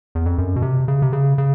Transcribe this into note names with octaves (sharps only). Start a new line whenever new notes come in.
E2
F2
F#2
B2
C3
C#3
C3
C#3
C#3